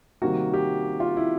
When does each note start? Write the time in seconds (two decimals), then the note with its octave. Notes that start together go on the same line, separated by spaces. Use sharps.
0.22 C3 D#3 G3 A#3 F#4
0.54 G4
1.00 F4
1.17 E4